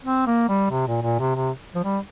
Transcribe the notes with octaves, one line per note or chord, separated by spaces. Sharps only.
C4
A#3
G3
C3
A#2
A#2
C3
C3
F3
G3